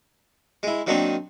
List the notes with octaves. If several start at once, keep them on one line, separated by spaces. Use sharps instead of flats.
G#3 E4
D#3 F#3 A#3 C4 D4 D#4